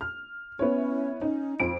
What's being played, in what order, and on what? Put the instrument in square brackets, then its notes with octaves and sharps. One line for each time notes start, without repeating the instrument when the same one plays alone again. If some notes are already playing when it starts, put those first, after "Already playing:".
[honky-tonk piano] F6
[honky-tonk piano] B3 E4 C#5 [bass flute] C#4
[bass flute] C#4 [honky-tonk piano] D#4
[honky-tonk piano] F2 D7 [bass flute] F4